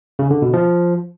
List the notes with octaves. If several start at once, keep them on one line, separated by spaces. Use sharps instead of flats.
C#3
D3
B2
F3